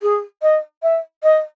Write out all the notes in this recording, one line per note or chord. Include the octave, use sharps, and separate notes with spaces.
G#4
D#5
E5
D#5